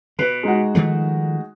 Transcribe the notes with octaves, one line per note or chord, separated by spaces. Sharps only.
B2 B4
G#3 D#4 F#4
D#3 F3 A3